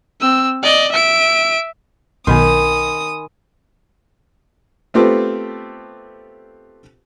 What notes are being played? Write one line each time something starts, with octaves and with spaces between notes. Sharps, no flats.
C4 E6
D5 D#5
E5 D7
B1 B2 D#3 G#5 B5 C6 D#6
A3 B3 C4 F4 G4 A4